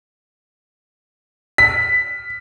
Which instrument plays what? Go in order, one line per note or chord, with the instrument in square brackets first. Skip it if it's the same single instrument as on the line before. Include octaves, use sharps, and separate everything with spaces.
[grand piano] B6